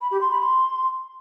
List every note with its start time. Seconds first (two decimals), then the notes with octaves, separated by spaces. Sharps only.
0.01 B5
0.11 G4
0.21 C6
0.31 B5
0.41 C6